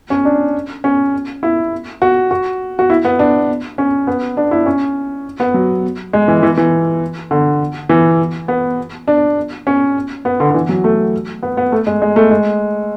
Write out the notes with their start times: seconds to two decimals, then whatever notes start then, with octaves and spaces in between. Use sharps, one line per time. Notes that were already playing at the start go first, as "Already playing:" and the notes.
0.10 C#4
0.25 D4
0.84 C#4
1.43 E4
2.02 F#4
2.31 F#4
2.79 F#4
2.90 E4
3.05 B3
3.19 D4
3.78 C#4
4.07 B3
4.37 D4
4.51 E4
4.66 C#4
5.40 B3
5.54 F#3
6.13 G#3
6.28 E3
6.43 E3
6.57 E3
7.31 D3
7.89 E3
8.48 B3
9.08 D4
9.67 C#4
10.25 B3
10.40 D3
10.51 D3
10.54 E3
10.69 F#3
10.84 A3
11.43 B3
11.57 B3
11.72 A3
11.87 G#3
12.02 G#3
12.16 A3
12.31 G#3